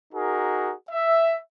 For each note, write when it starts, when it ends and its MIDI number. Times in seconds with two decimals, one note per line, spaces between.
0.13 0.72 63
0.13 0.72 66
0.13 0.72 68
0.13 0.72 70
0.89 1.36 76